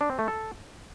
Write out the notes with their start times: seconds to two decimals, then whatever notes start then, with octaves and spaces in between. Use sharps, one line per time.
0.01 D4
0.10 C4
0.19 A3
0.28 A4